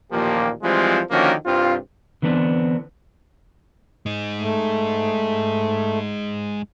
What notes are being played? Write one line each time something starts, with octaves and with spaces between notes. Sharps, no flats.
A1 D#2 A#2 F3 A#3 G4
E3 F3 G3 G#3 C4 F4
D3 D#3 F3 A#3 C#4 F#4
C2 G2 C4 F4
D3 E3 B3 C4 D4
G#3 D#4
A3